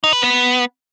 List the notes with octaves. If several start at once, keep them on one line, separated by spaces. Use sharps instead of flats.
D#4
B4
B3